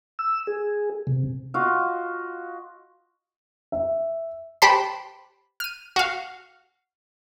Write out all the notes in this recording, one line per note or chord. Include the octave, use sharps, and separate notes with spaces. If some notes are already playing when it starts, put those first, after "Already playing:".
E6
G#4
C3
F4 F#4 D#5 F5
E5
G4 B4 C5 A5 B5
F6 D#7
F#4 F5